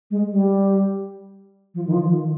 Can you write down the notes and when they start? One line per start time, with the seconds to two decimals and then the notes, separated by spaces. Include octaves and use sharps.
0.11 G#3
0.30 G3
1.74 F3
1.87 D#3
1.92 F3
2.10 D#3